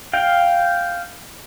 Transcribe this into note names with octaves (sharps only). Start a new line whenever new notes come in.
F5 G5